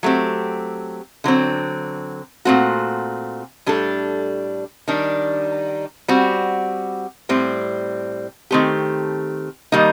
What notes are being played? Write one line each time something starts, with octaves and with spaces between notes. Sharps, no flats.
F#3 A3 C4 G4
D3 F#3 C4
A#2 A3 C4 F#4
A2 G3 D4 A4
D#3 G3 D4
G3 C4 F#4
A2 G3 C4
D#3 A3 C4 G4
D#3 G3 A#3 D#4